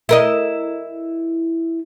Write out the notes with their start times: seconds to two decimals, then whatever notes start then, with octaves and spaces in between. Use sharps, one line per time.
0.09 E4 A#4 D#5